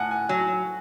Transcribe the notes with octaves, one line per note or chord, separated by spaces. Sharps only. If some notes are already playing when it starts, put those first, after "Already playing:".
Already playing: A2 F#5 G#5
G#5
F#3 G#5